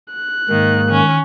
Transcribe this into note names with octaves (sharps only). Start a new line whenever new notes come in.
F#6
G#2 D#3 A#3
D#3 C#4